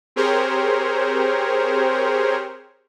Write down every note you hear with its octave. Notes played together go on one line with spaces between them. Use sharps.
C4 G4 G#4 A#4 C5 C#5